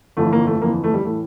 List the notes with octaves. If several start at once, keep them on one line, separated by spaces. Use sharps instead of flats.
G1 F2 E3 A3
A#3
A3
G1 F2 E3 A#3
A3
G3
A2 E3 A3